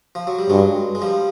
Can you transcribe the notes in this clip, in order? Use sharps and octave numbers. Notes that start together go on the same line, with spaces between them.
F3
F#3
G3
G2 F#3 G#3
G#3
F3 G3